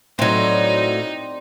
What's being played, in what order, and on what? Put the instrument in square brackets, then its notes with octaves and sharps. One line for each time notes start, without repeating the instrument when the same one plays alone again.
[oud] A2 F#3 [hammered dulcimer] C4 D5 [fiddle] D#4